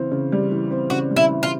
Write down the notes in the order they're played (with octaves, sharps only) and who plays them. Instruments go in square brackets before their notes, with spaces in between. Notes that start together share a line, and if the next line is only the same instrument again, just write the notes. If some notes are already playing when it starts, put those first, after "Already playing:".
Already playing: [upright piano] C#3 E3 C4
C#3
G3
E3
C4
[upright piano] C#3 [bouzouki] F#4
[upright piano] G3
[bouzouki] E4
[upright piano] E3
[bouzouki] F4